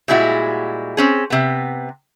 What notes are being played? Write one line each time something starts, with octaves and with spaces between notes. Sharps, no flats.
A#2 G3 G#3 E4 F#4
C4 C#4 G#4
C3 B3